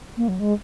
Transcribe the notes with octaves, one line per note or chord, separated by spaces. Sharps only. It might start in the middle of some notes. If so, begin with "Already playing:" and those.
A#3
F#3
G#3